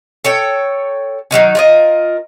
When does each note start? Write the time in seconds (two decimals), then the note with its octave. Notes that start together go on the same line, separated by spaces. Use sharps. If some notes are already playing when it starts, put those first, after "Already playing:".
0.24 A4 C#5 G5
1.31 D3 D#3 F#3 D#4
1.55 F4 A#4 D#5